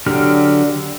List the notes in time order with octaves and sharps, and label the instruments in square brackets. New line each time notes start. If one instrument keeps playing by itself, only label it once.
[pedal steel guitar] D3 F#3 G4 F6